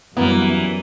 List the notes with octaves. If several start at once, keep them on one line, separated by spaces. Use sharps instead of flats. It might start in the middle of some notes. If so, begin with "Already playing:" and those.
F#2 E3 F#3 G3 A#3 B3